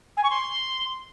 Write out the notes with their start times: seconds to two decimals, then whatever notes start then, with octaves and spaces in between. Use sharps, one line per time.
0.16 G#5
0.23 C#6
0.29 C6